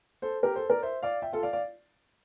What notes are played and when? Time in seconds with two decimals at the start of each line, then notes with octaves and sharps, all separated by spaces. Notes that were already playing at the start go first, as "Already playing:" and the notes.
0.22 A4 C5
0.43 G4 A#4
0.56 A4 C5
0.70 A#4 D5
0.83 C5 E5
1.02 D5 F5
1.22 E5 G5
1.33 F4 A4
1.43 D5 F5
1.53 D5 F5